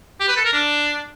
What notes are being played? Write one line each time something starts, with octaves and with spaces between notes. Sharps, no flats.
G4
B4
A4
A#4
D4